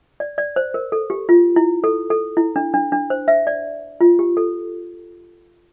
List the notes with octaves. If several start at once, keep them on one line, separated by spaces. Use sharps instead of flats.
D5
D5
C5
A#4
A4
G4
F4
E4
A4
A4
E4
D4
D4
D4
C5
E5
D5
F4
G4
A4